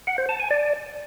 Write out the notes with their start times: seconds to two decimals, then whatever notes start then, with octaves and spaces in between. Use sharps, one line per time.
0.07 F#5
0.18 C5
0.29 A5
0.40 G#5
0.51 D5